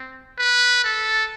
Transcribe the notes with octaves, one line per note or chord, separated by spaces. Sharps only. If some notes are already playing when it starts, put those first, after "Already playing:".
Already playing: C4
B4
A4